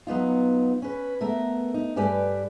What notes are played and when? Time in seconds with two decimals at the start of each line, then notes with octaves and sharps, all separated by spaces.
0.07 F#3 B3 D#4 F4
0.82 C#4 B4
1.21 A3 B3 A#4
1.74 D#4
1.96 G2 A3 G4 B4 D5 G#5